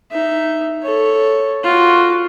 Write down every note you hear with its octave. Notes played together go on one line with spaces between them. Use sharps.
D#4 E5
A4 C#5
F4 F#4